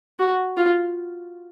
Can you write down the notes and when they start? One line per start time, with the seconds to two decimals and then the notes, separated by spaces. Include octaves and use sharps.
0.19 F#4
0.57 F4